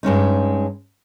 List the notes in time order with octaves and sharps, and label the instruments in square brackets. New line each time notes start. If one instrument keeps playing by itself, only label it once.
[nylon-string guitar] G2 G#3 C#4 D#4